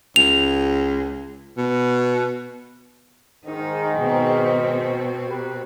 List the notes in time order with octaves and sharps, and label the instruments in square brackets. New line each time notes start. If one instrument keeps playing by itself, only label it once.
[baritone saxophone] C#2 [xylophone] F7
[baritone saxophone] B2
[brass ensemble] G#2 D#3 [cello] D#4
[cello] B2 C4
[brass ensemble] G4 A#4 B4